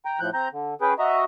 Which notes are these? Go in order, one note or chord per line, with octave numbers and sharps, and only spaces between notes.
G5 A#5
A2 F3 F#6 G6
C4 A#5 G6
D3
C#4 G#4 B4 G5
F#4 D#5 E5 A#5